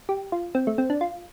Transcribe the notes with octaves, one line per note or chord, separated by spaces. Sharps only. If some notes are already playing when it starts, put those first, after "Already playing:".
G4
F4
C4
A3
C4
D4
F4